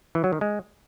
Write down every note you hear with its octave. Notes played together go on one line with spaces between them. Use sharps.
E3
F#3
D#3
G#3